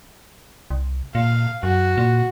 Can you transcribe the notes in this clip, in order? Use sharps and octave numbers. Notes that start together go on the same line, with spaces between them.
C2
A#2 F5
F#2 F#4
A#2